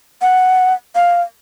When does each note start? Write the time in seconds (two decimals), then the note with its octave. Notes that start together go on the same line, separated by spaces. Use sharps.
0.22 F#5
0.95 F5